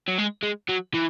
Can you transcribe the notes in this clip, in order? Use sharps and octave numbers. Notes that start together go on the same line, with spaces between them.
F#3
G#3
G#3
F#3
E3